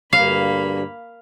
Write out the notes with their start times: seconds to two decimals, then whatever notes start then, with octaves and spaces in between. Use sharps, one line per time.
0.13 D2 G2 A#3 F5 B5